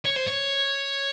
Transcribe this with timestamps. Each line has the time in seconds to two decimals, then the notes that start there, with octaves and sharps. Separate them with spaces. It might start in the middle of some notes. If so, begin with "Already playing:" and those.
0.05 C#5
0.16 C5
0.27 C#5